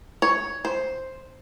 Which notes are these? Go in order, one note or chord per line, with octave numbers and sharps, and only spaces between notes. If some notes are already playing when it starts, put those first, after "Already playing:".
C#5
C5